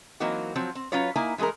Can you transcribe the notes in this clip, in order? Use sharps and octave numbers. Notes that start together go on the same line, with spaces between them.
E3 F#3 A#3 C4 D#4 F#4
F3 F#3 C4
C4
F#3 C#4 F4 B4 C#5
A#3 D#4 E4 G#5
E3 G#3 A3 G#4 A#4